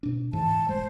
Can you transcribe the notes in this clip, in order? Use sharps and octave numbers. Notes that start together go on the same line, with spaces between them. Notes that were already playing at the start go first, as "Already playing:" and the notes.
B2 D4
G#2 E3 A5
E1 G#3 C5